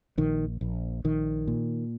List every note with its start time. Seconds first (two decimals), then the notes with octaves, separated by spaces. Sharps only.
0.18 A#1 D#3
0.61 A#1
1.04 A#1 D#3
1.48 A#2